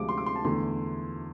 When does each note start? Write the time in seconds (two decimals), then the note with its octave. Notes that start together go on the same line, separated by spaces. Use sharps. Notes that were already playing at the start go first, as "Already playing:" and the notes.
Already playing: D2 C3 F3 G#3 D6
0.09 C6
0.18 D6
0.26 C6
0.36 A5
0.44 E2 D3 A3 C6